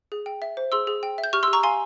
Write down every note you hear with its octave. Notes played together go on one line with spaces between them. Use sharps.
G#4
G5
E5
C5
G#4 C6 E6
G#4
G5
E5
G6
G4 C#6 F6
C6 E6
G4
A#5 C#6
F5 G#5 C6